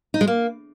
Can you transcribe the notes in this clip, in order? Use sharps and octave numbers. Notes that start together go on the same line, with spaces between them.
D#4
G#3
A#3